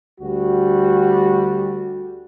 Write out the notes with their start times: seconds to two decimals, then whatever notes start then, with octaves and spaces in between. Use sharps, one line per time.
0.21 D2 G3 F#4